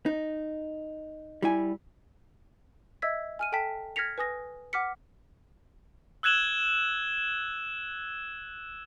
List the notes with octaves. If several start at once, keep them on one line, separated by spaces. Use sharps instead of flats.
D#4
G3 E4 G#5
D#5 E5 E6 G#6 B6
G#5 F6 D#7
A4 G5 A5 B6
F6 G#6 A#6 B6 C#7 F7
B4 G#5 D#6 A#6
F#5 D6 F6 B6 C#7
E6 F#6 G#6 E7 F#7 G7